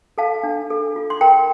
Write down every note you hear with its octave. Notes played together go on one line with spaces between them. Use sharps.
A4 F5 A5
D4
A4
F4
C6
A#4 G5 A#5